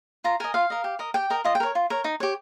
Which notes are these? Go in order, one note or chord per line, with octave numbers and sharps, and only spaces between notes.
F4 A#5
A#4 D#5 G#5
F4 F5
A#4 D#5
G4
A#4 D#5
G4 G5
A#4 D#5
F4 D#5
G5
A#4 C#5
F4
A#4 C#5
D#4
G4 C#5